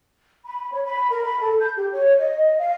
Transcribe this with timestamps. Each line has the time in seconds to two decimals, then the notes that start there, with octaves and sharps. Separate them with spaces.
0.45 B5
0.72 C#5
0.85 B5
1.11 A#4
1.24 B5
1.40 A4
1.59 G6
1.77 G4
1.92 C#5
2.18 D#5
2.59 F5